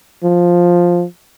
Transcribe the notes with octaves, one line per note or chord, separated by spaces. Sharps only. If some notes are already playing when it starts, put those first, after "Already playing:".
F3